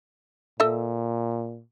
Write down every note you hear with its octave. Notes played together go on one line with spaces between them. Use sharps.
A#2 A4 D#5 E5